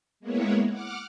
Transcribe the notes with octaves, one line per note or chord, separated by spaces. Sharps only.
G#3 A#3 B3 E4 C#5
F#5 D6 F6